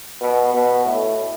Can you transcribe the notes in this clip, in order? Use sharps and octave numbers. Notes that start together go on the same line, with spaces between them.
B2
B2
A2